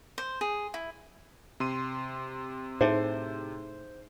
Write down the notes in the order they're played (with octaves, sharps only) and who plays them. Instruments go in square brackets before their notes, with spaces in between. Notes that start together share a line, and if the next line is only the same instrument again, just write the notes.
[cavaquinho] C5
G#4
E4
[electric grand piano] C3 C6 D#7
[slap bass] A2 [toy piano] D#4 G#4 E5 [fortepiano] C5